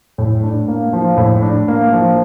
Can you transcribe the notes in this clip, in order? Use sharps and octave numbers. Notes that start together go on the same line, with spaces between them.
A2
D4
A#3
F3
A2
D4
A#3
F3